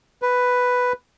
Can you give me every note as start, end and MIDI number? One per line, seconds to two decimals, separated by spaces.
0.22 0.93 71